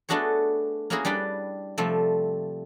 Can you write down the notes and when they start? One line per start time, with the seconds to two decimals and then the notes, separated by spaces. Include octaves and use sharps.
0.09 A3 B3 D4 F#4 G#4 C#5
0.90 A#3 C#4 E4 F#4 G#4 A#4
1.05 G3 D4 B4 G5
1.78 C3 F3 G3 A3 C4